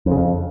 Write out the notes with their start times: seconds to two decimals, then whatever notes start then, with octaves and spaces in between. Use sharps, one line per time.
0.06 F2
0.11 C#3
0.17 F2